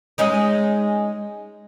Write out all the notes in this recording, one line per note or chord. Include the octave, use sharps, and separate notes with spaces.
G#3 C#4 D#4